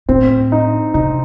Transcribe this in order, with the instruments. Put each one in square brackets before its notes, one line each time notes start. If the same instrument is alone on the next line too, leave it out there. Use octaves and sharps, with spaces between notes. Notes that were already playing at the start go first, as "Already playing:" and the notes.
[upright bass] A2 [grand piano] C4
[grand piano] D#4
[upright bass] C3 [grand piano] D#4